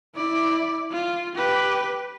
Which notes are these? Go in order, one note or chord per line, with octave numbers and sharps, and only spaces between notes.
E4 D5
F4
G4 B4